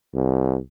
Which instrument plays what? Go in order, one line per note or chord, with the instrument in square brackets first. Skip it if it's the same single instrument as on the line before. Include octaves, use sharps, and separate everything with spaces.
[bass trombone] C2